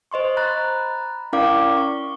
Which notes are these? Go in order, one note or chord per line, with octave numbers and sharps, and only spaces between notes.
C5 D#5 C6 C#6
A#5 B5 F#6 A6
C#4 E4 A#4 D5 F5 D6
C#6